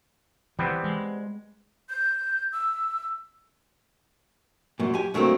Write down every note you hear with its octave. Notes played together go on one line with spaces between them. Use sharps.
E3 G3 B3 C4
G#3
G6
E6
F#2 A#2
G4 G#5
G2 F#3 A3 A#3 C4